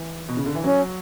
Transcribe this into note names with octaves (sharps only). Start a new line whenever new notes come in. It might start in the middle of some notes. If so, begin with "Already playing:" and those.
Already playing: E3
B2
C#3
D3
E3
F#3 C#4